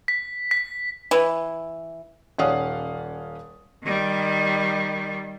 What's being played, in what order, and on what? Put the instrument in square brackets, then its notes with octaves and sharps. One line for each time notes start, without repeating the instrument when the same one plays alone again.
[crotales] B6
B6
[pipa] E3
[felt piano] D#1 C#4 D5 F5 F#5 D#6
[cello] D#3 G3